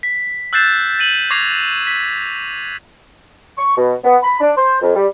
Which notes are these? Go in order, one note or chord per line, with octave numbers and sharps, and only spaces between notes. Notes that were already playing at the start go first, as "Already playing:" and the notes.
B6
E6 F#6 G6 A6 C7 E7
A6 D#7 F#7
C#6 D6 G#6 A#6 C7 F7
B6
C#6
B2
B3
B5
D4
C5
F2
G3